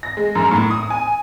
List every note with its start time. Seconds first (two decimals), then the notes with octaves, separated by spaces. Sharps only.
0.03 A#6
0.17 G#3
0.35 F#2
0.51 A2
0.70 D#6
0.90 G#5